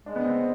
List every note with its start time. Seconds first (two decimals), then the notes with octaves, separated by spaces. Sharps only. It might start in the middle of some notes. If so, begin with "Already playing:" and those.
0.06 G#3 D4
0.16 B3
0.25 C4